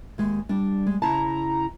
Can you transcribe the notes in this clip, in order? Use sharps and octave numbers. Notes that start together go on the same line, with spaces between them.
D#2 G#3
G3 D4
G#3
C#3 E4 A5 A#5